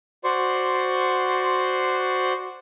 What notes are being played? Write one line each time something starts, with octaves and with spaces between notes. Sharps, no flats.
F#4 C5 D5 C6 C#6